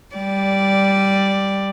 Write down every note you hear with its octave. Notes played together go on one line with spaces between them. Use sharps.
G3 D5